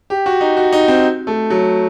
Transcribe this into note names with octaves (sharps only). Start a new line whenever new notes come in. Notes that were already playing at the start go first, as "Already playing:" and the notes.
G4
F#4
D#4
F#4
D#4
C4
A3
F#3